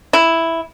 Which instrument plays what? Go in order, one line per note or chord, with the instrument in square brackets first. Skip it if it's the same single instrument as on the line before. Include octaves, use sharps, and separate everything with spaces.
[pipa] E4